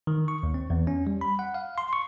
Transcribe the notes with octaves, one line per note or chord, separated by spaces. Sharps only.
D#3
C#6
D#2
C4
E2
C#4
G3
B5
F#5
F5
C6
C#6